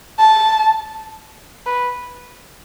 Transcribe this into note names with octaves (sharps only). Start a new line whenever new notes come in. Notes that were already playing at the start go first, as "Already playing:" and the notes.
A5
B4